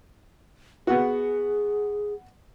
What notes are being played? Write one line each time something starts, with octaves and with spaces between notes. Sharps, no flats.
B3 F#4 G#4